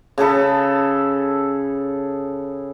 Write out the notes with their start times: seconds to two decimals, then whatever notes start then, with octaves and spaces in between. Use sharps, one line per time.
0.18 C#3 G#4 A4 B5